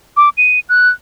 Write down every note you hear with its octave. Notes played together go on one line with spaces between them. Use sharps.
D6
D#7
F#6